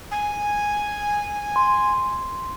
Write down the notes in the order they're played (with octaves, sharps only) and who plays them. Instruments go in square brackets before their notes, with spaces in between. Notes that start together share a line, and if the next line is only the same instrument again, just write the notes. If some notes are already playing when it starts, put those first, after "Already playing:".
[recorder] G#5
[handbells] C6